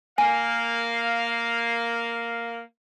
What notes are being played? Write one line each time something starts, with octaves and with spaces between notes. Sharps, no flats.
A#3 F5 G#5